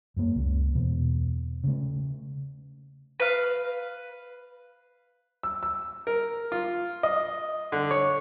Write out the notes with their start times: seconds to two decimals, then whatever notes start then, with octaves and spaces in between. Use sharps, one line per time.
0.17 F#2 A#3
0.36 C#2 C#3
0.74 E2 B2
1.64 C#3 A3
3.20 B4 F5
5.43 E6
5.63 E6
6.07 A#4
6.52 F4
7.03 D#5
7.72 D3
7.91 C#5